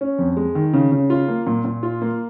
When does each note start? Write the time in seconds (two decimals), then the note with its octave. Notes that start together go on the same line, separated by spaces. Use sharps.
0.01 C#4
0.18 F2
0.37 G#3
0.55 D#3
0.73 C#3
0.92 C#3
1.10 F4
1.28 A#3
1.47 A#2
1.65 A#2
1.83 F4
2.02 A#3